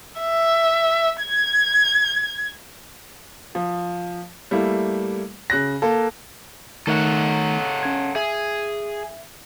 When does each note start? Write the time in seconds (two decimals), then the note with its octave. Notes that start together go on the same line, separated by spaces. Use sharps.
0.20 E5
1.21 G#6
3.55 F3
4.51 G3 A3 A#3 E4
5.50 C#3 F#6 A#6
5.82 A#3 A4
6.87 D#3 A3 D#4 A4 C#5 F#5
7.83 C#4 G#6
8.16 G#4 E5